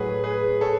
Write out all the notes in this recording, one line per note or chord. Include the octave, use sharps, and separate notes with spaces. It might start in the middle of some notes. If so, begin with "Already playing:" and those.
Already playing: A2 F#3 G#4 B4
G#4 B4
A4 C#5